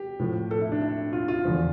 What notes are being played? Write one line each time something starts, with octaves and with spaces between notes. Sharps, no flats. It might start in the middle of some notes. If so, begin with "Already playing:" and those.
Already playing: G4
A2 F3
A4
E4
D4
E4
F4
F4
E2 D3 F3